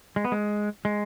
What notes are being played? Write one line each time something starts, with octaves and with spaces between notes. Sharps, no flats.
G#3
B3
G#3
G#3